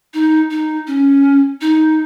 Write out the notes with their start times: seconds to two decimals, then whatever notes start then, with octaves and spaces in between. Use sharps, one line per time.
0.14 D#4
0.51 D#4
0.87 C#4
1.61 D#4